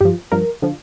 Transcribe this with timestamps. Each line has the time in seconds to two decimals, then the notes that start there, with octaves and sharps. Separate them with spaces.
0.01 G2 F3 G4
0.32 G2 F3 A#4
0.62 D3 F3